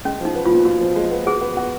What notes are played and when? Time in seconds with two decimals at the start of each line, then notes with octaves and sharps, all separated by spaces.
0.05 G#3 C#4
0.20 F3 D#4
0.35 B3
0.46 F4
0.51 A#2
0.65 A#2 F#4
0.81 F3
0.96 G#3
1.11 B3
1.26 F#4 G#4
1.41 B3
1.57 F#4